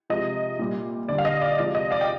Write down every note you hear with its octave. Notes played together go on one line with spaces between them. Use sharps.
C3 F3 G#3 D#5
A#2 G3
D3 G3 D5
F5
D#5
D5
C3 F3 G#3 D5
D#5
D5 F5
G5